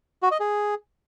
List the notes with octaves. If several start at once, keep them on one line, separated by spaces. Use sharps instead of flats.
F#4
D#5
G#4